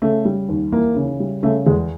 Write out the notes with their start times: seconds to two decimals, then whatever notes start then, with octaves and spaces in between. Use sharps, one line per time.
0.02 C#3 A3
0.25 G3
0.49 D#2
0.72 E3 A#3
0.97 C#3
1.20 G3
1.43 C#3 A3
1.66 E2 G#3